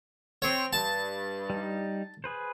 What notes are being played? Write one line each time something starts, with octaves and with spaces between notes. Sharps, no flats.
C4 C#5
G2 A5
G3 D#4
G#4 B4 C5